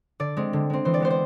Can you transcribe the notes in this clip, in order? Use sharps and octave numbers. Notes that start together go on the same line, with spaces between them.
D3 D5
G#3 C4
D3
G#3 C4
E3 C5
D5
G#3 B3 C5
C5